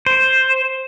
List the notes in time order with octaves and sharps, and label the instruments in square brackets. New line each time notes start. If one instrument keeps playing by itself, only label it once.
[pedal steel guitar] C5